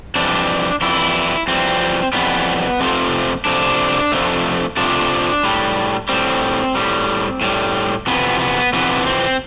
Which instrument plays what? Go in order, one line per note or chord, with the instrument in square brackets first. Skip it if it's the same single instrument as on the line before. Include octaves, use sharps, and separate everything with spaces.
[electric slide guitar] F2 E3 G3 D4
F2 E3 G3 E4
F2 E3 G3 C4
F2 E3 G3 B3
F2 C3 F3 A3
F2 C3 F3 A3 D4
F2 C3 F3 A3
F2 C3 F3 A3 D4
A2 G3
A2 G3 C4
A2 G3
A2 G3
F2 C3 E3 B3
B3
F2 C3 E3 B3
C4